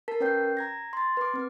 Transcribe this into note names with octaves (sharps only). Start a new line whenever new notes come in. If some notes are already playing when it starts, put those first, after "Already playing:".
A#4 A5 B6
C#4 B4 C#5 G5 G6 C7
A#5 G#6 A#6
C6 A6
B4 D6
C4 B4